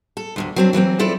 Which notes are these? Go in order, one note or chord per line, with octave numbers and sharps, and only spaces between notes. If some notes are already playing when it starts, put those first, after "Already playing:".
A4
D2 A2 C3
F#3 C4 D4
E3 F#3 A#3 C4
E4 F4 A4 D5 E5